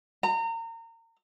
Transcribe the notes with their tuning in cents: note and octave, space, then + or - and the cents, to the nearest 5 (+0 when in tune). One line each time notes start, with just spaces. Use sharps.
A#5 -30